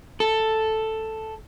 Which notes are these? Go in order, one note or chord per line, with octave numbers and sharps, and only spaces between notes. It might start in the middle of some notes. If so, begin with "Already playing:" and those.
A4